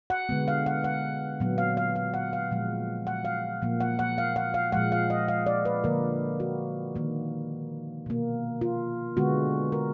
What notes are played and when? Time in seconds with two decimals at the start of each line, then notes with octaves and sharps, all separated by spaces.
0.10 F#5
0.29 D3 G#3 B3
0.48 F5
0.66 F#5
0.84 F#5
1.40 A#2 F#3 B3
1.58 F5
1.77 F5
1.96 F5
2.14 F#5
2.33 F5
2.51 A#2 F3 G#3
3.07 F#5
3.25 F5
3.62 A#2 F3 A#3
3.80 F#5
3.99 F#5
4.18 F5
4.36 F#5
4.54 F5
4.72 A#2 F3 G#3 F#5
4.92 F5
5.10 D#5
5.28 F5
5.47 D5
5.65 B4
5.84 D3 F3 A#3 A#4
6.40 F#4
6.96 D#3 A#3
8.06 B2 A#3
8.61 F4
9.17 D3 G#3 B3 F#4
9.72 A#4